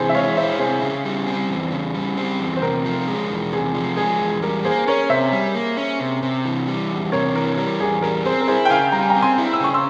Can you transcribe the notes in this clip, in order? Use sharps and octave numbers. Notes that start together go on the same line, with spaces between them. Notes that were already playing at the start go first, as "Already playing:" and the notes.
Already playing: C3 E3 G#4 C5
E5
G#3 C#5 F5
E4 C5 E5
C3 G#4 C5
C#3
G3
C4
E2
C#3
G3
C4
E2
C5
C3 A#4
F3
G#3
E2
C3 G#4
F3
G#3 G#4
E2
G3 A#4
A#3 G#4 C5
C#4 A#4 C#5
C3 C5 E5
G3
A#3
C#4
C3
C3
E3
G3
E2
C3 A#4 C#5
E3 A#4
G3 A#4
E2 G#4
G3 A#4
C4 G#4 C5
A#4
E4 G#4 C5
G5
C#3 F5 G#5
G3 A#5
G#5
G5 A#5
C4
G#5 C6
E4
E6
C#3 C#6
C6 E6